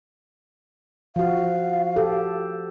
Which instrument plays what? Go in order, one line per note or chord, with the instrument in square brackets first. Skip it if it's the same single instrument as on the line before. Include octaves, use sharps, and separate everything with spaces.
[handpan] F3 F#4 [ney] F5
[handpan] G4 A4